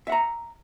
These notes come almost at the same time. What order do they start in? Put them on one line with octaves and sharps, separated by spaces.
E5 F#5 A#5